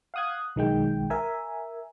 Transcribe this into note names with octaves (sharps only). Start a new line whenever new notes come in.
F5 F#5 D#6 F#6 G#6
B1 D#3 G#3 G5
A#4 E5 G#5